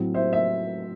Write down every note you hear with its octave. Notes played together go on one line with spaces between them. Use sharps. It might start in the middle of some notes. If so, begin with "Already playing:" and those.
Already playing: A2 F#3 C4
C5 E5
E5